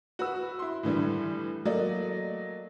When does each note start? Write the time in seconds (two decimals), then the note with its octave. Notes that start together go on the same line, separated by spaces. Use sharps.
0.19 F#4 B4 E6
0.59 E4 C6
0.83 A2 D3 E3 G3
1.65 F#3 A3 A#3 D5 D#5